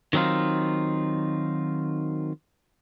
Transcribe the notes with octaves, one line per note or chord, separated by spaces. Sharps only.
D#3 F#3 C4 D#4 F4